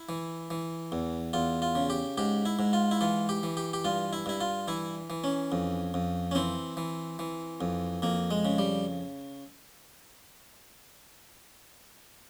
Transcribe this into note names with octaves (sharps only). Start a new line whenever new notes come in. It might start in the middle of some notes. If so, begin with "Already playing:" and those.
Already playing: E4
E3
E3
E2
E2 F4
F4
C#3
G4
G#2 G4
E4
G#2
F4
E4
E3 F4
G4
E3
G4
G4
G2 F4
E4
G2 E4
F4
E3 E4
E3
C#4
F2
F2
C#4
E3 C4
E3
E3
F2
F2 A#3
G#3
C#3
G3